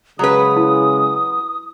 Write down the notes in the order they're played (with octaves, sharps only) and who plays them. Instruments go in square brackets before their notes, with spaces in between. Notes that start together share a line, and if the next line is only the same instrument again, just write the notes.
[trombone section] C#3 G#3 [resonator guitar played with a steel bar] F#3 B4 [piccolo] D#6
[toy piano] E4